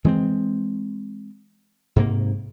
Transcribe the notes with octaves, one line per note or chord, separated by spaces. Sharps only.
E3 G#3 B3 C4
G#2 C3 A#3